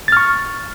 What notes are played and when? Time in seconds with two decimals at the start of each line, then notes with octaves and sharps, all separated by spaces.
0.08 A6
0.12 F6
0.17 C#6